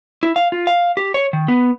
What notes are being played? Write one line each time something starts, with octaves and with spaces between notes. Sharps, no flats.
E4
F5
F4
F5
G4
C#5
D#3
B3